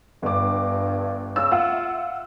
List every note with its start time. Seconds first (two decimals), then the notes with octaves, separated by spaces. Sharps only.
0.23 G1 G2 D6
1.36 C#3 E6
1.51 F4 E5 F#5 E6